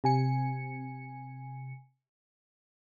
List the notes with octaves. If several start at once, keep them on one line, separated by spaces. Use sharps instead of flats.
C3 G#5 C#7